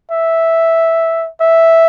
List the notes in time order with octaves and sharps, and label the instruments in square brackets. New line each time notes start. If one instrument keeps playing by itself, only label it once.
[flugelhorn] E5
E5